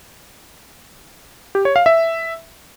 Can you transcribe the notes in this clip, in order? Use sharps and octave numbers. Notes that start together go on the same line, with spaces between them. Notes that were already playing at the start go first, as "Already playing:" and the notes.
G4
C#5
F5
E5